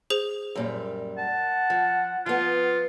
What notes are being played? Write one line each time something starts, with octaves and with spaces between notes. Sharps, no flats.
G#4 C5 F7
F#2 A#2 G3
F#5 A5
F3
F3 B3 F4